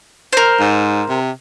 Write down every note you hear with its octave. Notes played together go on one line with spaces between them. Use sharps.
A#4 C5
G#2
C3